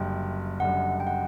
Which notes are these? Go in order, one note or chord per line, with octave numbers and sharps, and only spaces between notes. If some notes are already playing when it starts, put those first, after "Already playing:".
Already playing: F#1 F#2 D3 G3 G5
F#1 F#2 D3 G3 F#5
G5
F#5